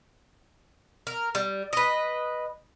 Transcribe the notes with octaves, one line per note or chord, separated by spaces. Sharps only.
A#4
G3
B4 D#5